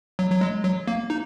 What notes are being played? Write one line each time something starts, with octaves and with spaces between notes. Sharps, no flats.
F#3
F#3
G#3
F#3
A#3
D#4